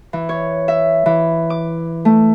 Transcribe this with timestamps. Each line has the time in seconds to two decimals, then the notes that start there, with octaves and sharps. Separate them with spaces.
0.13 E3
0.29 C#5
0.68 E5
1.06 E3
1.50 D6
2.05 A3